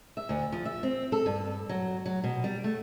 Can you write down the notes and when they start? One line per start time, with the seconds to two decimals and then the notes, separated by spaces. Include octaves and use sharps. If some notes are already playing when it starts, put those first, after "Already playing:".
0.17 E5
0.29 D2
0.52 F3
0.65 E5
0.83 C4
1.12 A4
1.26 G2
1.69 F#3
2.06 F#3
2.24 B2
2.44 G3
2.64 A3